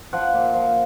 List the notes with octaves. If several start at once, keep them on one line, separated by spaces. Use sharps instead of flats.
F3 F#5
A#2
F3